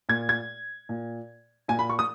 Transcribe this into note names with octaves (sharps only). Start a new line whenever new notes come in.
A#2 G#6
G#6
A#2
A#2 G#5
B5
C#6
D#6